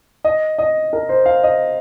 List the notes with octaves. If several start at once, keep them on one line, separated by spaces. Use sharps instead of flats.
D#5
D#5
A#4
C5
F5
D#5